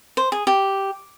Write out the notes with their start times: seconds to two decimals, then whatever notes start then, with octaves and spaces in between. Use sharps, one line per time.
0.17 C5
0.32 G#4
0.47 G4